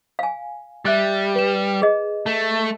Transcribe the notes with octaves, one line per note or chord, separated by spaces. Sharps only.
F5 G#5
G3 E5 F#6 A6
B4 E7
G#4 D#5
A3